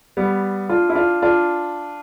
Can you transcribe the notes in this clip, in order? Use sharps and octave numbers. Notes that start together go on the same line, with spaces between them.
G3 B3
D4 F4
E4
D4 F4
D4 F4